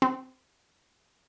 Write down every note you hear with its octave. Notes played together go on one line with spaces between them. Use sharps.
C4